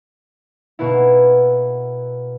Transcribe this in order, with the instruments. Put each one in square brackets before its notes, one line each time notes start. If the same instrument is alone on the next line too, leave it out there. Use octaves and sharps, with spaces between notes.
[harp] B2 A#3 B3 E4